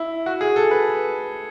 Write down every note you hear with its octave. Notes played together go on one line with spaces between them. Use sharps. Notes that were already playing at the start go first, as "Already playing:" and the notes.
Already playing: E4
F#4
G#4
A4
B4